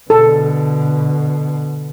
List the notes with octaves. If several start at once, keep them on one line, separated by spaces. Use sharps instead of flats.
B2 D3 A4